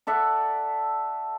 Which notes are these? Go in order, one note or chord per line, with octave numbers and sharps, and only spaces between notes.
A4 D5 E5 F#5